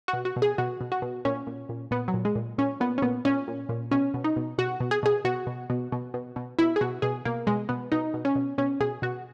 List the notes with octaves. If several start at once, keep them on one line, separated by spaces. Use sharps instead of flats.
F#4
B2
F#4
B2
G#4
B2 F#4
B2
F#4
B2
A#2 C#4
A#2
A#2
A#2 B3
F#3
A#2
G#3
A#2
A#2 C#4
A#2 B3
C#4
A#2 B3
A#2 C#4
A#2
A#2
B2 C#4
B2
D#4
B2
B2 F#4
B2
G#4
B2 G#4
B2 F#4
B2
B2
B2
B2
B2
B2 E4
G#4
B2 F#4
B2 G#4
B2 A#3
B2 G#3
B2 B3
B2 D#4
B2
C#4
B2
B2 C#4
B2 G#4
B2 F#4